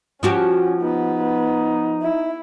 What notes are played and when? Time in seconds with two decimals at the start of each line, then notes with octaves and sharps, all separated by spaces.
0.23 F3 C#4 F#4 G4
0.81 B3 D#4
2.02 E4